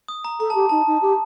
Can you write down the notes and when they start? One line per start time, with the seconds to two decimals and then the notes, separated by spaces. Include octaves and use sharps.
0.08 D#6
0.24 A#5
0.40 A4 A#5
0.50 A5
0.55 G4
0.69 D#4 A5
0.87 D#4
1.02 G4